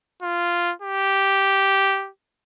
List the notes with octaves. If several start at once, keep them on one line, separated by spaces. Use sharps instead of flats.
F4
G4